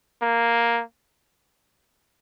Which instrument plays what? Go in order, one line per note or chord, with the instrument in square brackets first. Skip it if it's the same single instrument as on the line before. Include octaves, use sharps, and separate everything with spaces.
[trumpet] A#3